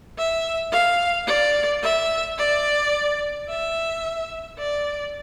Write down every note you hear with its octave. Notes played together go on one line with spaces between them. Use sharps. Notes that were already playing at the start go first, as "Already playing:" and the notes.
E5
F5
D5
E5
D5
E5
D5